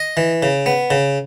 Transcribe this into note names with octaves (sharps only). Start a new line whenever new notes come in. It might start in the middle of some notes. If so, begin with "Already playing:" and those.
Already playing: D#5
E3
C#3
B3
C#3